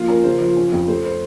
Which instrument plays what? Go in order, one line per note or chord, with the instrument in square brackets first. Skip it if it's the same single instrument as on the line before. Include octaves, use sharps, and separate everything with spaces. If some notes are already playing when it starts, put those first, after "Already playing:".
Already playing: [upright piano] F3 A#3 [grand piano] F4
[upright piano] C#4 [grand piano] A#4
[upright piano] C#3 [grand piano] C5
[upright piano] F3
C#4
F2
[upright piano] A3 [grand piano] C5
[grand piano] C5